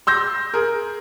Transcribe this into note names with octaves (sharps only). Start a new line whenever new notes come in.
C6 E6 G6 A#6
G#4 A#4